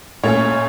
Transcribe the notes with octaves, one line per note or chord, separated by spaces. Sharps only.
A#2 A3 C#4 C#5